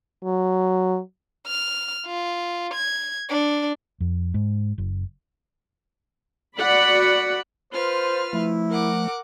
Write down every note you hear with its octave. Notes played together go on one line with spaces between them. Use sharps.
F#3
F6
F4
G#6
D4
F2
G#2
F#1
F#4 D5 F#5 B5
F4 B4 C5 F6
F3 A3 E4
A#4 F#5 D6